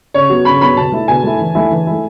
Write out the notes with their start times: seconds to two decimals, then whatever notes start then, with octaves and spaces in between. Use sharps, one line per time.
0.14 C#3 C#5
0.29 F#3 B3 F#4
0.45 C#3 B5
0.61 F#3 B3 F#4 B5
0.77 B2 A5
0.92 A3 E4
1.08 B2 G#5
1.24 A3 E4
1.40 E3
1.55 A3 E4
1.71 E3
1.87 A3 E4